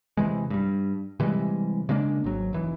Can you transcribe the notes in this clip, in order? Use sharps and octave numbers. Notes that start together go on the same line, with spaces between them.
C3 E3 G#3
G2 G3
C3 E3 G3 G#3
C#3 G#3 A#3 D4
G#1 F#3
F1 E3